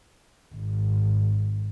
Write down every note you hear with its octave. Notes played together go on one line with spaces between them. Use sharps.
G#1